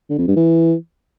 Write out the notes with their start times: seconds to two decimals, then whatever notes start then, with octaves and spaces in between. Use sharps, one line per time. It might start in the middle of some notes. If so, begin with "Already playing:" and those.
0.10 D3
0.19 F2
0.28 G2
0.36 E3